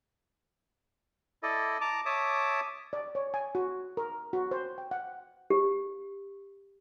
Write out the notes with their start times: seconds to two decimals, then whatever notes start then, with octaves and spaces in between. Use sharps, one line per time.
1.43 E4 A4 D5 D#5
1.81 A5 A#5 D6
2.06 C#5 E5 A5 D6 D#6
2.93 D5
3.15 C#5
3.34 G#5
3.55 F#4
3.97 A#4
4.33 F#4
4.51 C5
4.78 G5
4.91 F#5
5.50 G4